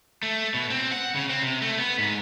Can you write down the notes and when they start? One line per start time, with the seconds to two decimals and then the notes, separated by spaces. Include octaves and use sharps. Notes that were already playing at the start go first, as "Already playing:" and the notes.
0.23 A3
0.54 B2
0.70 C4
0.92 F#5
1.15 C#3
1.29 C4
1.42 C3
1.62 A3
1.78 B3
1.98 G#2